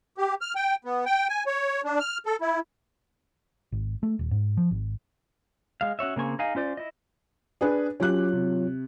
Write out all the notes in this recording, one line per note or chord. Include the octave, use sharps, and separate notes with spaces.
G4
F6
G5
B3
G5
G#5
C#5
D4
F6
A4
E4
G#1
A3
D#1
G#2
F3
G#1
G#3 F5
C#4 F#4 C#5 E5
C#3 A#3 C4 G#5 C#6
D#4 G#4 F5 G#5
C#4 F4 C5 D5
E4 D#5
D4 G#4 B4
F#3 C#4 F4 G4 C#5 F#6
C3